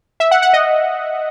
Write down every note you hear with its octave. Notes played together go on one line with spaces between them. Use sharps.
E5
F#5
F#5
D#5